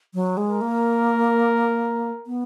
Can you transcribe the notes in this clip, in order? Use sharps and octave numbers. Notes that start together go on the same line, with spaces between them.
F#3
G#3
A#4
A#3
B3